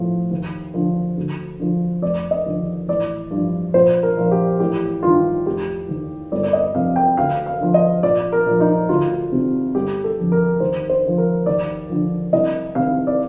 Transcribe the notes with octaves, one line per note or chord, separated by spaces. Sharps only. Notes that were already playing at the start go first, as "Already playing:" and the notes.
Already playing: A2 F3
D#2
D3 F3
D2
D3 F3
F1 D5
D#5
D#2 D3 F3
A1 D5
G2 F3
A#1 C5
A#4
A#2 F3
G4
A1 G4
G2 D#3 F4
F1 G4
D#2 D#3
G1 D5
D5
D#5
F2 C3 F5
G5
D2 F5
F5
D3 F3
D#5
A#1 D5
A#4
A#2 F3
D#4
D2 F4
C3 D#3
G1 G4
A4
F2 D3 F3
A#4
D#2 C5
C5
D3 F3
A#4
D#2 D5
D3 F3
C2 D#5
C3 D#3 F5
D5